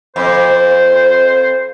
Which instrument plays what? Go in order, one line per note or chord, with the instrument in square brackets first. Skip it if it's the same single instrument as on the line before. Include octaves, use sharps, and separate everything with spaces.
[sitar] F2 [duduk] C5